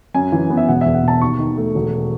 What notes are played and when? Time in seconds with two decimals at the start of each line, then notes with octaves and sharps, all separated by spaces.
0.14 F#2 G#5
0.32 E3
0.50 B3
0.57 E5
0.68 E1 F#5
0.81 E5
0.86 E2
0.95 F#5
1.03 B2 A5
1.21 D#2 C#6
1.39 D#3
1.57 A3
1.75 E1